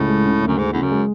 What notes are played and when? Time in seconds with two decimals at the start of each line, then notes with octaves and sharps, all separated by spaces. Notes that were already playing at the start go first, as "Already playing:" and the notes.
Already playing: C#2 A2
0.09 G#3
0.26 C#3
0.42 D2
0.47 F#2
0.58 D2 G#2
0.73 E2 C#3
0.82 F#2
0.91 G#3